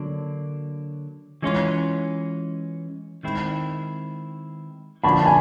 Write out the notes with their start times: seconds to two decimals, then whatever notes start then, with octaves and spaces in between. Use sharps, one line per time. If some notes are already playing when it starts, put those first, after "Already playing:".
Already playing: D3 F#3 A#3 D4
1.42 E3 G#3 C#4 F4
3.23 D#3 G#3 C4 E4
5.04 D3 F3 A#3 D4 F#4 A5 B5
5.26 G#5